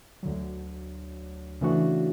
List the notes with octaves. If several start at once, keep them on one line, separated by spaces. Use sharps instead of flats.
D2 D3 F#3
C#3 E3 A3 D4 F#4